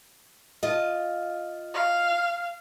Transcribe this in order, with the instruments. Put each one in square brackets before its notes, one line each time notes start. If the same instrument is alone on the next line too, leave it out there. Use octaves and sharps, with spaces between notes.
[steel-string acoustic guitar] F4 D#5
[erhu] F5